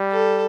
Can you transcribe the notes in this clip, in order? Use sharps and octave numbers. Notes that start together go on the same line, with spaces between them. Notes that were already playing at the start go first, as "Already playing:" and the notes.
Already playing: G3
A4